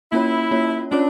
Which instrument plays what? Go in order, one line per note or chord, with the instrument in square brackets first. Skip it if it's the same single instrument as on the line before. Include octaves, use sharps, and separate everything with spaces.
[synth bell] A#3 C#4 F4 C#5 [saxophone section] E4
[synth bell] A#3 C#4 F4 C#5
[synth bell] A#3 C#4 F4 C#5 [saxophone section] D4